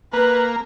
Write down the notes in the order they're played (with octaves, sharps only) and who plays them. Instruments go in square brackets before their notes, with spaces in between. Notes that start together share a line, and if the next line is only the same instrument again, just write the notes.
[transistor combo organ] A#3 [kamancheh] B4